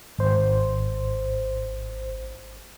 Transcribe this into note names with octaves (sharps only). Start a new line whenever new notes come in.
G#1 C5